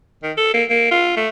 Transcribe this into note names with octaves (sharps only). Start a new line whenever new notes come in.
D#3
A4
A#3
A#3
F4
A3